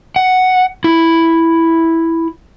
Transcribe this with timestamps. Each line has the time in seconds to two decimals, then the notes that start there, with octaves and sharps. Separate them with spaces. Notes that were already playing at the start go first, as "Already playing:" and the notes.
0.16 F#5
0.84 E4